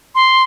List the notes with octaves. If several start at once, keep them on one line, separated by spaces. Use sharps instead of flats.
C6